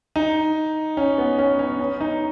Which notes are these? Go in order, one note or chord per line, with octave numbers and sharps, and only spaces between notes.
D#4
C#4
B3
C#4
C#4
C#4
D#4